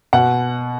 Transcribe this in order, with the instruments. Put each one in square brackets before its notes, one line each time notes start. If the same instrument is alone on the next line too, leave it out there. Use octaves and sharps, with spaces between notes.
[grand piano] B2 F#5